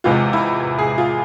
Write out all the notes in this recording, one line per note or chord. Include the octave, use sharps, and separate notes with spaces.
E2 C3 E3 G#3 F4
E4
G#4
F4